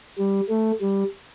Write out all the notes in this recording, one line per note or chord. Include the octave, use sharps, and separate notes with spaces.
G3
A3
G3